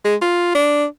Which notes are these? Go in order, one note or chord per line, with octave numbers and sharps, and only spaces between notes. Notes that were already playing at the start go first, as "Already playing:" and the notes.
G#3
F4
D4